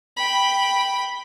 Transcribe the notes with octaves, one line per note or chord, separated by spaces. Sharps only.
G5 B5